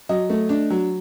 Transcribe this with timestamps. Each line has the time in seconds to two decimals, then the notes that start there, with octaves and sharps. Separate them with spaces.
0.09 F#3 D#5
0.30 A3
0.49 D4
0.70 F#3